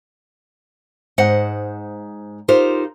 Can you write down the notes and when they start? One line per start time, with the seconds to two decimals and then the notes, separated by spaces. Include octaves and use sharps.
1.18 G#2 C5 D#5 F#5
2.48 D#4 F4 G4 A#4 C5